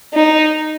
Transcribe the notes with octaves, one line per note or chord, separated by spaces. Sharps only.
D#4